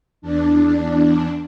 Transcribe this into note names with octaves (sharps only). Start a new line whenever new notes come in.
E2 D4